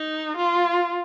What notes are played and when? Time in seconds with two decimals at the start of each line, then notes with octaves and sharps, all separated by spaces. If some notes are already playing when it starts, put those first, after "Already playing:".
Already playing: D#4
0.37 F4